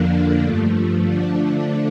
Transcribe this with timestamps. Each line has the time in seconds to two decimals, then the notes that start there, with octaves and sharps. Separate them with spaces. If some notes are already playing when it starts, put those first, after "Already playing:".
Already playing: F2 D3 F3 A#3 D4
0.42 G2 F3 A3
1.04 D3 F3 A3 D4